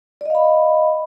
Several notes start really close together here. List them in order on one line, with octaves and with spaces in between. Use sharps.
D5 D#5 F5 B5